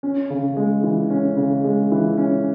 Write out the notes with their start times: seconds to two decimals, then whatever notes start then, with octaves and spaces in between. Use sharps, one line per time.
0.03 C#4
0.30 C#3
0.57 G#3
0.83 E3
1.10 C#4
1.37 C#3
1.64 G#3
1.91 E3
2.17 C#4